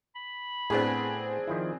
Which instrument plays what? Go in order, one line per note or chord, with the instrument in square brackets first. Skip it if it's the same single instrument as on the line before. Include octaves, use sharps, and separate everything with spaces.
[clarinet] B5
[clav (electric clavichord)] A2 B3 [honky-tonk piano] C4 D4 G#4
[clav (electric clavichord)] D#3 F3 E4